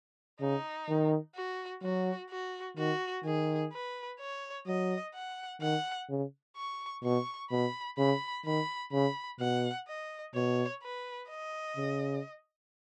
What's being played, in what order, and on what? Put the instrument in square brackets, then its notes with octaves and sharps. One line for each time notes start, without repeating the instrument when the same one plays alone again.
[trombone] C#3 [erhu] D#4
[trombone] D#3
[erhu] F#4
[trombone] F#3 [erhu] F#4
[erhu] F#4
[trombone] D#3 [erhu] F#4
[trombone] D#3 [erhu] G#4
[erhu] B4
C#5
[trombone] F#3 [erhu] D#5
[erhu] F#5
[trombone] D#3 [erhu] F#5
[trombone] C#3
[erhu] C#6
[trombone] B2 [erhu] C#6
[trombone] B2 [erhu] B5
[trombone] C#3 [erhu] B5
[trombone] D#3 [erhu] B5
[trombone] C#3 [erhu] B5
[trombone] B2 [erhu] F#5
[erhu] D#5
[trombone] B2 [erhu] C#5
[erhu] B4
D#5
[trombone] C#3